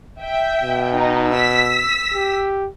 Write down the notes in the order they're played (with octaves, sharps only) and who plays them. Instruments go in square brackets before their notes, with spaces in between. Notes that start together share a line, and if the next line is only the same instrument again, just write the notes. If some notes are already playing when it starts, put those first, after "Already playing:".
[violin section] E5 G5
[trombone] B2
[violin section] D#4
E6 B6
[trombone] G4